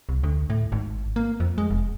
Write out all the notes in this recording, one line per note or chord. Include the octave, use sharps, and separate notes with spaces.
C2
D2
A2
G#1
A#3
F2
G#3
F1